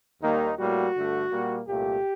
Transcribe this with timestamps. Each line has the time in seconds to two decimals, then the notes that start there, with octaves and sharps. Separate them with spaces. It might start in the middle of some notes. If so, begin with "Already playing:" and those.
0.22 D#2 D#3 G3 A#3 D#4
0.58 A2 G3 A#3 F#4
0.95 G2 D3 A3
1.31 A#2 G3 A#3
1.68 C2 A#2 A3 G4